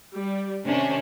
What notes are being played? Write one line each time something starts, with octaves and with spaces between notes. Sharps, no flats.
G3
C3 D#3 C#4 D4